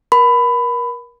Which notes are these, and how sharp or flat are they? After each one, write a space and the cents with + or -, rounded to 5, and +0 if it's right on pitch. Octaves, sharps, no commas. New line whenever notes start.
A#4 +30 B5 +20